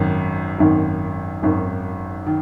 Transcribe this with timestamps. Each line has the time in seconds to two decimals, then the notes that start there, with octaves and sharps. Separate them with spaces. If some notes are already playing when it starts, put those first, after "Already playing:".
Already playing: G#1 F#2 D#3
0.58 G#1 F#2 D#3
1.42 G#1 F#2 D#3
2.26 D#3